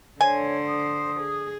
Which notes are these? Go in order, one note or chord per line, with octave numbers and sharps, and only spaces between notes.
D3 C5 C#5 G#5
D#6
G#4